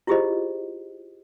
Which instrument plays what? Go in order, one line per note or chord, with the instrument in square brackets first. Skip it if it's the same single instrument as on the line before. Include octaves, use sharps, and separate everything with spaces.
[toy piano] E4 F4 G4 G#4 C5 D#5